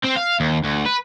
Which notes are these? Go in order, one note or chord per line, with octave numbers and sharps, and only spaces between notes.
C4
F5
D#2
D2
B4